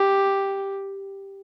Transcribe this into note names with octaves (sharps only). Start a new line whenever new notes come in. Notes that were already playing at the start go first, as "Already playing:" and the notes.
Already playing: G4